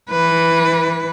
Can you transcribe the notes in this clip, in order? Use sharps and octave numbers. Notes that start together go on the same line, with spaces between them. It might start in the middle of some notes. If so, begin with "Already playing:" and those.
E3 B4